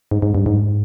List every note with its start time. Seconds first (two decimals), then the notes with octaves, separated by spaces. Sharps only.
0.11 G#2
0.22 G#2
0.35 G2
0.46 G#2